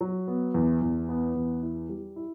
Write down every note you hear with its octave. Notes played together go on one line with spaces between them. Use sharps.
F#3
B3
E2
E2
B3
E2
E4
G3
E4